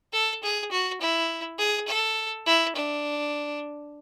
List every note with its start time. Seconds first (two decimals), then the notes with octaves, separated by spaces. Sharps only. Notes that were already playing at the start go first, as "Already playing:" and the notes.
0.13 A4
0.43 G#4
0.71 F#4
1.01 E4
1.58 G#4
1.88 A4
2.46 E4
2.75 D4